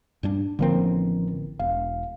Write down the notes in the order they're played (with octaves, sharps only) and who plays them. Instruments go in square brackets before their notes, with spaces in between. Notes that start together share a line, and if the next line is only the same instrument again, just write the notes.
[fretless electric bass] G2 G3 D4
[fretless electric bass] A1 A#3 C4 [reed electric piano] D3 F3 A#4
[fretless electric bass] E1 [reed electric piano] F5